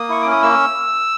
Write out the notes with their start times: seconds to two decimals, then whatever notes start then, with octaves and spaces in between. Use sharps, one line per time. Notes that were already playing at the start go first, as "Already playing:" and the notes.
Already playing: A#3 D#6
0.09 E4 C#6
0.22 C#4 D6
0.32 D#6
0.42 A#3 E6